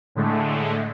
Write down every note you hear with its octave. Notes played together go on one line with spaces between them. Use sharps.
A2 D3 G#3 A3